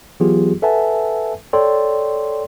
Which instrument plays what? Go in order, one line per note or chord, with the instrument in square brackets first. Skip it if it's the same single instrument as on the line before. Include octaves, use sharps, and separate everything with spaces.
[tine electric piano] E3 F#3 B3 F4 G4 G#4
A4 B4 E5 F#5 G#5 A5
A4 C#5 D5 G5 C6